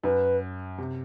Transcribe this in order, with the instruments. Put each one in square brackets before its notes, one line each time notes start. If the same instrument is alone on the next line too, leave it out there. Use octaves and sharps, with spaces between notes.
[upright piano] F#2 [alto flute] B4
[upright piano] C3